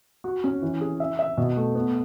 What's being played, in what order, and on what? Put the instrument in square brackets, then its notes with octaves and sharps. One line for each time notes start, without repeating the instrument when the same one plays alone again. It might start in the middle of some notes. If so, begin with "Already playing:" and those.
[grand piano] F#4
C#4
E3
G#4
E5
E5
B2
A3
B3